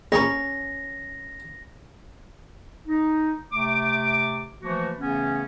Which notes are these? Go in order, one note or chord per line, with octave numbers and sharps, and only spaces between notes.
A#1 C#4 G#4 C#5 A#5 A#6
D#4
C3 A3 D6
E3 F3 A3 A#3 F#4
C#3 E3 A3 B3 C#4